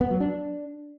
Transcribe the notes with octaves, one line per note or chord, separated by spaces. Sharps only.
B3
F#3
D4